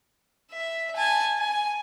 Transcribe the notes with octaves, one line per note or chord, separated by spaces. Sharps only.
E5
G#5 A5
G#5